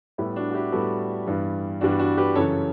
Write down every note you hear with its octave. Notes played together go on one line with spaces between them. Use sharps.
A2 G3 B3 E4
D4 F#4
F#4
E4 G4
A2 G3 B3 F#4 A4
G2 E3 G3 B3
G2 E3 G3 B3 D4 F#4
D4 F#4
G4 B4
F#2 C#3 E3 A4 C#5